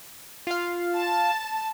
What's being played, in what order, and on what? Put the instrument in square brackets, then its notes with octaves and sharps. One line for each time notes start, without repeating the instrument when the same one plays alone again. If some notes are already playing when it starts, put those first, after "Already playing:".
[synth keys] F4 F5
[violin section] A5